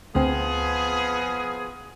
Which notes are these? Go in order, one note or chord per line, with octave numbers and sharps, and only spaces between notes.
D2 F3 B3 C4 G#4